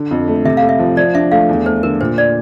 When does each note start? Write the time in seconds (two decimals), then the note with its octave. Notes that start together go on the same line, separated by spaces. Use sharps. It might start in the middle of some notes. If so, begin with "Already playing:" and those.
Already playing: D3
0.11 F2
0.28 A3
0.45 C3 E5
0.57 A3 F5
0.69 E5
0.79 F3
0.96 F3 D5
1.14 D4 E5
1.31 A3 F5
1.49 E2
1.66 A3 C5
1.83 D3 A#4
2.01 A#2 C5
2.18 D5